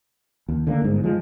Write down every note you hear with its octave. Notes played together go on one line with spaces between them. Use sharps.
D#2
D3 E3 A#3
G1 G#2
F3 G#3